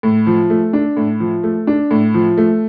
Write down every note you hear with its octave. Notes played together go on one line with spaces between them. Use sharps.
A2
F3
A3
D4
A2
F3
A3
D4
A2
F3
A3